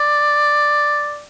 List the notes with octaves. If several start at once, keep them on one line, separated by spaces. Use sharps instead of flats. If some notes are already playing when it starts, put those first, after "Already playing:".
Already playing: D5